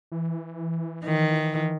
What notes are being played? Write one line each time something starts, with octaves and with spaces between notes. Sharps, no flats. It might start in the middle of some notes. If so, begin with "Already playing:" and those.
E3
D#3